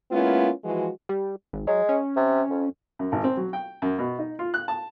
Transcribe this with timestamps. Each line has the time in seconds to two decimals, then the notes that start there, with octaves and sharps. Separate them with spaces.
0.12 G#3 A#3 B3 C#4 E4 F4
0.64 E3 F3 G#3 F#4
1.09 G3
1.53 G#1
1.67 F#3 G#3
1.89 C#4
2.16 C3
2.50 F2
2.99 F#2
3.12 G#1
3.24 C4
3.37 F#3
3.53 G5
3.82 F#2
3.98 B2
4.19 D#4
4.39 F4
4.54 F#6
4.68 A5